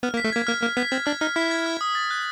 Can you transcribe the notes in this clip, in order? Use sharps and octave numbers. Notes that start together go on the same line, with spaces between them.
B3 F6
A#3
B6
A3
A#3 G#6
A#3 F6
A#3 F6
B3 B6
C4 G#6
D4 F6
D#4 F6
E4 B6
G#6
F6
D#6
A6
F#6